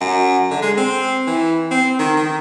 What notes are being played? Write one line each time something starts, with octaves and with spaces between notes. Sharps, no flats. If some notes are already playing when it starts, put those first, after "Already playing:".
F#2
D3
G#3
C4
E3
C4
D#3
D#3